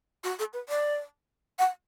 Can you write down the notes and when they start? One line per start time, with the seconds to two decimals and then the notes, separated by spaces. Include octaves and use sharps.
0.24 F#4
0.39 A4
0.53 B4
0.69 D5
1.59 F#5